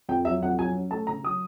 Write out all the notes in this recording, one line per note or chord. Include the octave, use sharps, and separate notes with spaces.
F2 G5
F#3 E5
F2 F#5
F#3 G#5
C#4
A3 A5
C#3 A#5
F#3 D#6